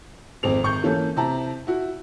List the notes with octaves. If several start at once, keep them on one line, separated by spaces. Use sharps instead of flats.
G#1 F2 C4 F7
G#1 C#6 G6
E3 A#3 C#4 A4
C3 E4 A5 A#5
E4 F#4